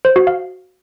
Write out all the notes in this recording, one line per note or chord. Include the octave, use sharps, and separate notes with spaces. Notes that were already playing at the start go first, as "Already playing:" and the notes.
C5
F#4
F5